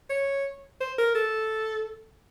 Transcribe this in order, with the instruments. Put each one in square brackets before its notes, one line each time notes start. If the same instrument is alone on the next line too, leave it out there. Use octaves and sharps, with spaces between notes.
[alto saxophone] C#5
C5
A#4
A4